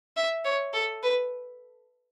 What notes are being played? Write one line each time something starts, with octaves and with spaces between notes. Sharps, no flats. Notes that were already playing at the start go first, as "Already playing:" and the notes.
E5
C#5
A4
B4